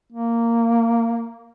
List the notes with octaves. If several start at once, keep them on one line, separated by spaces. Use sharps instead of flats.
A#3